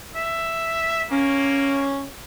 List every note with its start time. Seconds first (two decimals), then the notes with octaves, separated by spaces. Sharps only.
0.16 E5
1.11 A#3 C#4